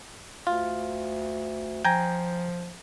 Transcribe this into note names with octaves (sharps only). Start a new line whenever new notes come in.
D2 F4
F3 G5 G#5 A#5